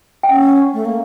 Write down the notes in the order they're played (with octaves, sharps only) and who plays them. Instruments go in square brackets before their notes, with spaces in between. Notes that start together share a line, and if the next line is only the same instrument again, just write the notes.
[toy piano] G5
[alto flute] C#4 [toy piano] F#5
[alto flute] A3
A#3